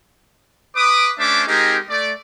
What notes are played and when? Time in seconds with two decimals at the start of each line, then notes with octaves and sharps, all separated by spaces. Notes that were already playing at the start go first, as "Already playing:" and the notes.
0.75 B4 D6 D#6
1.19 A3 C#4 D4 C5 E5 D6
1.48 G#3 C4 D#4 G4 G#4 A#4
1.90 A3 D5